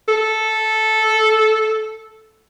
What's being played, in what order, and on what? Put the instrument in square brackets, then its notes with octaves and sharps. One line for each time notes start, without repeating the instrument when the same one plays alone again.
[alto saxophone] A4